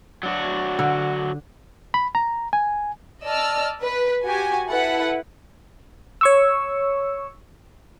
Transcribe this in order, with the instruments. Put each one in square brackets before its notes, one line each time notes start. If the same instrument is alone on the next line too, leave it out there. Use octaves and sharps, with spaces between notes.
[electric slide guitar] F#3 D4 F#4
[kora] D3
[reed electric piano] B5
A#5
G#5
[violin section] D5 D#5 A5 E6 F6
B4
F#4 G4 G#5
E4 A4 B4 F#5
[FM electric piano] C#5 C#6 E6